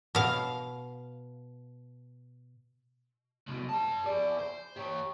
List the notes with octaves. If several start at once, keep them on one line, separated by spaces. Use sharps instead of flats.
B2 F5
C2 B2
G4 A5
G#4 D5
C5
G4 C#5